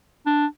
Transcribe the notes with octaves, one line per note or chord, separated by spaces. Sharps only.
D4